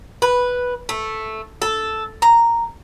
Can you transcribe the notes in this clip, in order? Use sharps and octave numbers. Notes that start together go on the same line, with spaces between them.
B4
A3
A4
A#5